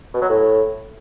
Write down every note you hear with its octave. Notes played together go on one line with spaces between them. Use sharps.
B2
F#3
A2